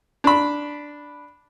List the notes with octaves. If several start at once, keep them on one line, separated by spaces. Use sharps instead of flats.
D4 B5